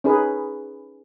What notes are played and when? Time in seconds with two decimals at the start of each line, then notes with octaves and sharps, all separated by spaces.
0.04 C#4 D#4 G#4 B4